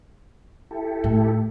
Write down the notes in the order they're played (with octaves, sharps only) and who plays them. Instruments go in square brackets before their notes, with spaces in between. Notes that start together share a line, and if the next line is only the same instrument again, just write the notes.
[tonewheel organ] E4 G4 A4
[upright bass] A2